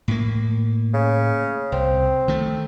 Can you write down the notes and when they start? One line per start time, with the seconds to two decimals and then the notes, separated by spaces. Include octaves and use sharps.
0.08 A2 A#3
0.93 C#3
1.72 C2 C4
2.28 D#3 A3